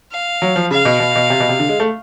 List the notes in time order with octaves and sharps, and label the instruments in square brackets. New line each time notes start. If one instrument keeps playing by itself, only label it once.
[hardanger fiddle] F5
[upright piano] F#3
F3
[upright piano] C#3 [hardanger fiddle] F5
[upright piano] B2
B2
B2
C3
B2
C3
D3
G#3
A3